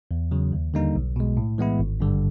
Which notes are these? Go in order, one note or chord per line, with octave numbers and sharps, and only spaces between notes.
E2
C#3 F#3
D#2
D3 G3 A#3 D#4
B1
B2 G#3
A2
E3 G#3 B3 E4
G#1
G2 D3 G3